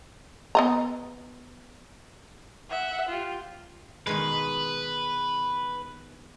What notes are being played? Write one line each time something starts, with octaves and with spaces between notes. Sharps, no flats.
B3 D#5 A#5
E5 F#5
F4 G4
B2 D#3 G#3 B4